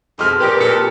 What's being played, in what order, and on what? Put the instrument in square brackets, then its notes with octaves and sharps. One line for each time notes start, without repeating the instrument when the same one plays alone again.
[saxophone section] F2 B2 G#3 [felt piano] C6 F6
[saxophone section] A#2 G4 [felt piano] B4
[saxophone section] A#2 A4 [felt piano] C#7